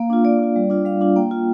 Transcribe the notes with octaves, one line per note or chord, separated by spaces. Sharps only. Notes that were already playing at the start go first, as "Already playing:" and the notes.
Already playing: A#3 F5
D4 F4
A#3 D5
D4 F4
G3
D4 F4
G3 F5
D4 F4
A#3 G5
F4